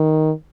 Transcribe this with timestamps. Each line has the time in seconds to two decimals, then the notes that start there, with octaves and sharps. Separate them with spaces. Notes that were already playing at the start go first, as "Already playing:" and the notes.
Already playing: D#3